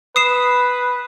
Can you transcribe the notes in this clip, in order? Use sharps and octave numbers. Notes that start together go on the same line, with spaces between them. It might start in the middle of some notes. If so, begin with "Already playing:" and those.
B4 D#6 C7 E7